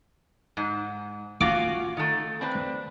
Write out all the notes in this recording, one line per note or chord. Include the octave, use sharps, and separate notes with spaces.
G#2
C#4 F4 F#4 D6
D#3 A3
C4 D4 B4